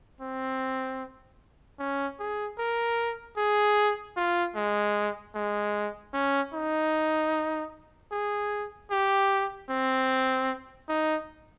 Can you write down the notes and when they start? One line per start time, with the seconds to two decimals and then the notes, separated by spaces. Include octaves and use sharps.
0.21 C4
1.79 C#4
2.19 G#4
2.59 A#4
3.37 G#4
4.17 F4
4.56 G#3
5.35 G#3
6.14 C#4
6.54 D#4
8.12 G#4
8.91 G4
9.69 C4
10.89 D#4